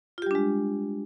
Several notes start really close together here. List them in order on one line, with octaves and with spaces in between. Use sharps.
F4 G4 G3 D4 G#3